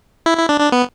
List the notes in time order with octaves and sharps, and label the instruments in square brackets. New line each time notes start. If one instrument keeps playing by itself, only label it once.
[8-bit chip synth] E4
E4
D4
D4
B3